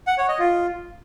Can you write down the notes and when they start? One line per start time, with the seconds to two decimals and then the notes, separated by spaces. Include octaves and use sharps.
0.07 F#5
0.18 C#5
0.29 D#5
0.39 F4